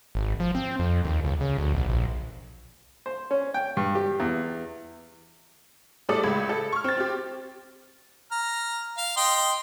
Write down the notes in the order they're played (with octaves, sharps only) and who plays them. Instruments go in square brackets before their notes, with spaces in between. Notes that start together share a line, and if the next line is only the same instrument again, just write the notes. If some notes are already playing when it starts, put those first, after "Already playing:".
[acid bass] G#1
F3
C4
F2
D#2
C#2
C#3
D2
B1
A#1
[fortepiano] C5
C#4
G5
G2
G4
E2
[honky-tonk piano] A2 G3 A3 A4 D5 D#6
C#2 G#3 B5 G#6
A4
C#6 F6
C4 A6
C4 G4
[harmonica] A#5 F6
F5
D#5 G5 C6